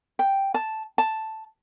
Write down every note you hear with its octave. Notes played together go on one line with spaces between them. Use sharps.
G5
A5
A5